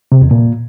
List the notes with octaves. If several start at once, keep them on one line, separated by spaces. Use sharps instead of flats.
C3
E2
A#2